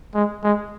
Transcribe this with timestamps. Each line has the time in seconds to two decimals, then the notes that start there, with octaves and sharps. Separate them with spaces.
0.15 G#3
0.43 G#3